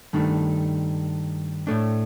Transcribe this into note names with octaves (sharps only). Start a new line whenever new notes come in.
G2 D#3 A3 D4
A2 A3 D4